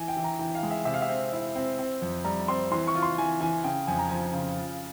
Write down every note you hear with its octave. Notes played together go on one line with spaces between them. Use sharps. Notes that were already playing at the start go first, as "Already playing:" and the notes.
Already playing: E3 G#5
G5
E3
A#5
E3 G5
F5
G#3
E5
C3 E5
F5
E5
C4
E4
C4
C4
F2
G3 A#5
C4 C6
E3 C6
C#6
F4
C6
E3 G#5
E3 G#5
C#3 G5
F2 G#5
A#5
F3 G#5
C#3
F4